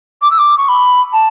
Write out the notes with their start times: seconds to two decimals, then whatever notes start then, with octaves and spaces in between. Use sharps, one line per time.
0.22 D6
0.31 E6
0.38 D6
0.57 C#6
0.68 B5
1.13 A5